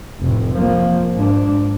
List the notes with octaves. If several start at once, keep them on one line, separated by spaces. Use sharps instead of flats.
F1 A2
F3 A#3
G#2 D4